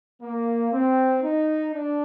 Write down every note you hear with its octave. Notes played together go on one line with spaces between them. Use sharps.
A#3
C4
D#4
D4